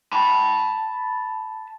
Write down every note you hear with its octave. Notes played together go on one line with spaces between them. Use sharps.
A5 B5